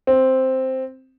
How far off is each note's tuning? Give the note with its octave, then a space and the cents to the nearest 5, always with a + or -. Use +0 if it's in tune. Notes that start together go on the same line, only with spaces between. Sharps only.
C4 +0